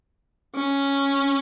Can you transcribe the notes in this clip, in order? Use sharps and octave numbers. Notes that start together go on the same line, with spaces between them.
C#4